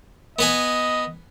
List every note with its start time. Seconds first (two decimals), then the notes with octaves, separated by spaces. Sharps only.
0.39 B3 B4 D#5 G#5